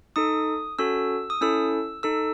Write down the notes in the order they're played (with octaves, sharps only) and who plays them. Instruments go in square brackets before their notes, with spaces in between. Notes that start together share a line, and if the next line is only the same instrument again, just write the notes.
[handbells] D#4 A4 D#6
C#4 F#4 A4 E6
D#6
C#4 E4 A4 E6
D#4 A4 E6